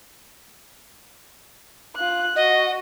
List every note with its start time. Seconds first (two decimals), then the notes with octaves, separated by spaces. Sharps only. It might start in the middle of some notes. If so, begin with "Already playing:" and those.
1.96 F4 F#6
2.36 F#4 D#5